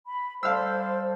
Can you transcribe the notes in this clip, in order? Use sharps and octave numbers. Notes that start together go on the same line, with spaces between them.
B5
G3 A4 C5 D5 F5 E6